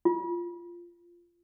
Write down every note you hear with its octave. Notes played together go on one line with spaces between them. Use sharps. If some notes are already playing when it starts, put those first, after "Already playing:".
F4